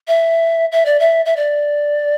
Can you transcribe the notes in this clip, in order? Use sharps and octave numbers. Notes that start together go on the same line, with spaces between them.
E5
E5
D5
E5
E5
D5